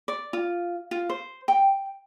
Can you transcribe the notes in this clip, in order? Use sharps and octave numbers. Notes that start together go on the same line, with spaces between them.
D5
F4
F4
C5
G5